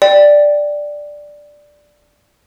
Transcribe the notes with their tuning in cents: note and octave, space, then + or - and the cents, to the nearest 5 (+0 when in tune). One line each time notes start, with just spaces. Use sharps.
D5 +0 G5 +0